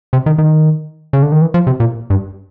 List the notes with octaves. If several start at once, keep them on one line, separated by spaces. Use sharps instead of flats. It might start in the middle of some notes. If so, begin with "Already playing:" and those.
C3
D#3
D#3
C#3
D3
D#3
E3
F3
C3
A#2
G2